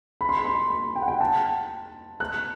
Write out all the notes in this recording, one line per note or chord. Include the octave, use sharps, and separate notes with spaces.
B5
C6
B5
C6
B5
G5
F#5
G5
A5
F#6